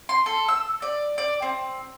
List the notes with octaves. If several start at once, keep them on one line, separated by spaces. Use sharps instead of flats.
C6
A4
E6
D5
D5
C4